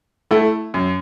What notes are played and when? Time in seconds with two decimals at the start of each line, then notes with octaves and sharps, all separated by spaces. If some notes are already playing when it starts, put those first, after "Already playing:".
0.31 A3 E4
0.74 F#2